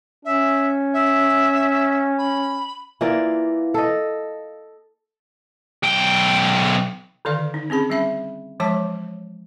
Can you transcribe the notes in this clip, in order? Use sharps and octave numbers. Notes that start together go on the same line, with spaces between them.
C#4 E5
E5
B5
E3 A#3 F4 D5
A4 D#5
B1 G5
D3 D#3 A4 D5 F5
D#4
C4 C#4 G#4 B5
G3 C#4 E5 B5
E3 F3 G#3 C#5 A5 D6